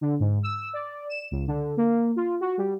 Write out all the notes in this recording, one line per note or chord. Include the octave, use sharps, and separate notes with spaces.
D3
G#2
E6
D5
E7
C#2
D3
A#3
F4
F#4
G3